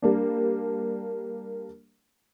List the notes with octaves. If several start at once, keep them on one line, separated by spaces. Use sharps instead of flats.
G3 A#3 D4